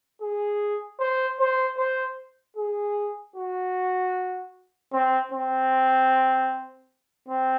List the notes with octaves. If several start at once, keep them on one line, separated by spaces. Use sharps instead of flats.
G#4
C5
C5
C5
G#4
F#4
C4
C4
C4